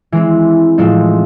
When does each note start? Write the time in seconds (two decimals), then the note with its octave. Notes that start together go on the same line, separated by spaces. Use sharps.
0.12 E3 G#3 C4
0.78 A2 F3 G#3 C4 D#4